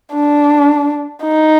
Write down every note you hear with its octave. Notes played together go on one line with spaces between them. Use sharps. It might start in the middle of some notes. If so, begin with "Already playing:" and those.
D4
D#4